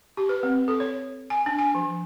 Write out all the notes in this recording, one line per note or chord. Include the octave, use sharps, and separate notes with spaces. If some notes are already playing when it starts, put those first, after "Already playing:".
G4
B4
C4
A4
C#5
G#5
D4
G#5
F3